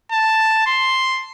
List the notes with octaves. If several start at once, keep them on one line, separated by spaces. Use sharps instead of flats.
A5
C6